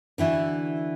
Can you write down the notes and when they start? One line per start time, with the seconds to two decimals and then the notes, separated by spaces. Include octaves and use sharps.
0.18 D3 E3 E4 F#4